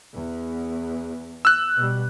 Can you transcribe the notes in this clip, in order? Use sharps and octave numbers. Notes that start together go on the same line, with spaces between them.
E2
E6 F#6
B2 G3